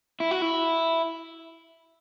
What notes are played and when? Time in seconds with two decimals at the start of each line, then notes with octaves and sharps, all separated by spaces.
0.20 E4
0.31 F#4
0.42 E4